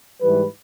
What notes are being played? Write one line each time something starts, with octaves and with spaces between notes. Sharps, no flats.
G#2 E3 G3 B4